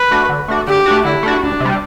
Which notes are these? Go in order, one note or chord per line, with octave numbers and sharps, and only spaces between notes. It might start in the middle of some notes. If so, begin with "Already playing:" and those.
Already playing: B4
A3 D4 F#4
D3
A3 D4 F#4
D3 G4
A3 D4 F#4
D3 E4
A3 D4 F#4
D2 D4
C3 G3